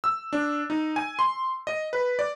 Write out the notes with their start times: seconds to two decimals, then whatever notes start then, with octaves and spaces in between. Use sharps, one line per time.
0.04 E6
0.33 D4
0.70 D#4
0.96 G#5
1.19 C6
1.67 D#5
1.93 B4
2.19 D5